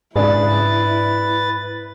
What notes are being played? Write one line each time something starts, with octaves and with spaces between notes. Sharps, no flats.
G#2 C#3 D4 E4 G#4 B4 A6